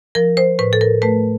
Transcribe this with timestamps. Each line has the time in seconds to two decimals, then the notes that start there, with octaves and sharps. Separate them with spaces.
0.15 F3 A#4
0.37 C5
0.59 A2 B4
0.73 A4
0.81 A#4
1.02 A3 B4